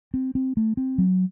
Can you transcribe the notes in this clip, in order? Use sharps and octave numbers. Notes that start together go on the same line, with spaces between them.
C4
C4
A3
C4
F#3